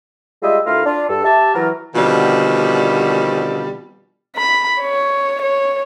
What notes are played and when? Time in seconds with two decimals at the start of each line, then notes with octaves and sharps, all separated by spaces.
0.43 G3 G#3 F4 D#5 E5
0.66 D2 A3 E4 F4 A#4 F5
0.86 D4 F4
1.09 G2 A4
1.24 G4 E5 A5
1.55 E3 F#3 A#4
1.95 B2 D3 D#3 F3 G3 C4
4.37 B5
4.81 C#5
5.42 C#5